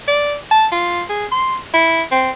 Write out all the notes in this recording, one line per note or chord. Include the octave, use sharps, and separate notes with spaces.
D5
A5
F4
G#4
C6
E4
C4